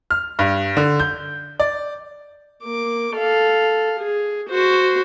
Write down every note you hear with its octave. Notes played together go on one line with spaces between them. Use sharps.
F6
G2
D3
G6
D5
A#3 D6
A4 F5
G#4
F#4 C5